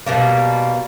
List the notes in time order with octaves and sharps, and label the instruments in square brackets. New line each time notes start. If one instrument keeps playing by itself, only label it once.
[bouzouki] B2 G3 A#3